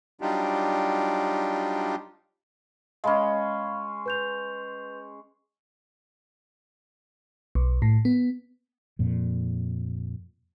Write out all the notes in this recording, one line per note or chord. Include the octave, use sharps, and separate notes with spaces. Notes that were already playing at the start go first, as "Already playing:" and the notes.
F#3 G3 D4 D#4 F4 G4
G#3 C#4 F5 B5
B4 G6 F7
B1
A2
B3
F2 A#2